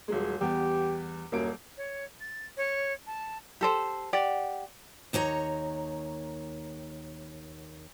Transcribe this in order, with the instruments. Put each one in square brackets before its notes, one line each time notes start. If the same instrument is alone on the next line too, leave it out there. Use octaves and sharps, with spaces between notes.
[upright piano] D#1 F#3 G#3
[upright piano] E2 G3 B3 [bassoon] G4
[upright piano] D#1 A#3 D7 [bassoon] F#2
[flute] C#5
A6
C#5
A5
[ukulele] G4 A4 C5
G4 D5 F#5
[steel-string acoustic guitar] D#2 D#4 C#5 A#5